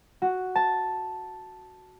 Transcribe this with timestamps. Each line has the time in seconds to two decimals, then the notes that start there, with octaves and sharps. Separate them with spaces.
0.22 F#4
0.55 A5